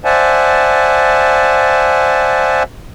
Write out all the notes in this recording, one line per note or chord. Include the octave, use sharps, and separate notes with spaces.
C5 D5 E5 F#5 G#5 A5